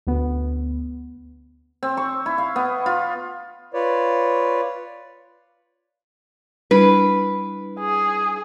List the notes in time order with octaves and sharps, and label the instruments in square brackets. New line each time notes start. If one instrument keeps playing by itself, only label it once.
[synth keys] D2 B3
[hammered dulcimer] C4
C#6
E4
F5
B3
F4
[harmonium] F4 B4 C#5 D5
[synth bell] G3 D4 E4 [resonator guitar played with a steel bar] B4
[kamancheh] G#4